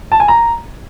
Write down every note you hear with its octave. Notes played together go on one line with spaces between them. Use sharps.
A5
G#5
A#5